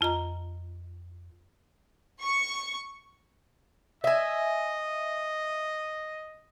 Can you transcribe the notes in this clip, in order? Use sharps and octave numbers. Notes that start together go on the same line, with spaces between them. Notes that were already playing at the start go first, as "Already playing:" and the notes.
F2 F4 D#5 A#5
C#6
D#5 E5 G#5